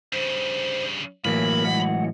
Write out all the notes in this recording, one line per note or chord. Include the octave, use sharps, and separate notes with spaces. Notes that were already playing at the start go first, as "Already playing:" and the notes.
G2 C#3 C5
A2 E3 F#3 A#3 A#4 B5
G#3 F#5